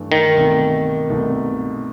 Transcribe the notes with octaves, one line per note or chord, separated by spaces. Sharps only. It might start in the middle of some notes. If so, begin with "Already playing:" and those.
Already playing: G2 E3 A3
D#3
C2 B2 A3 D#4
C2 B2 A3 D#4